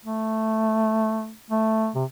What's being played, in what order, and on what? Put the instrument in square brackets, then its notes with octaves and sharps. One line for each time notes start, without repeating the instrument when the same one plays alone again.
[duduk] A3
A3
C3